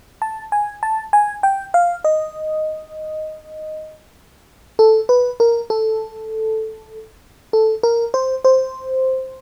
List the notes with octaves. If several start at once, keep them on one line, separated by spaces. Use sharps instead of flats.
A5
G#5
A5
G#5
G5
F5
D#5
A4
B4
A#4
A4
A4
A#4
C5
C5